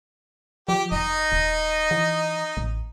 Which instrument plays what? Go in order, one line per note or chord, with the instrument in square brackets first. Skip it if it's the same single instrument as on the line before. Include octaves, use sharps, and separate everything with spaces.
[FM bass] F3 [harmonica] G4
[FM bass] F1 [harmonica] D#4 D#5
[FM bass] D#1
E3
A1